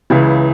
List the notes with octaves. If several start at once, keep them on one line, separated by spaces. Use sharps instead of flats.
C#2 C#3 E3